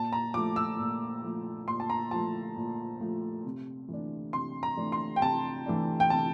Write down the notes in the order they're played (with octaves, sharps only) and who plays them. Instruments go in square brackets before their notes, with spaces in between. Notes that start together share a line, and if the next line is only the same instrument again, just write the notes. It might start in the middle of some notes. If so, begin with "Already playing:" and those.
Already playing: [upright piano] A#2 A5
A#5
F3 A3 D6
E6
A#2
F3 A3
A#2 C6
A5
A#5
F3 A3 A5
A#2
F3 A3
C3
E3 A3 D4
C3 C6
A#5
E3 A3 D4
C6
G5
C3 A5
E3 A3 D4
G5
C3 A5